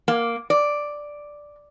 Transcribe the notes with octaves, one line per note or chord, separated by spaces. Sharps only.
A#3
D5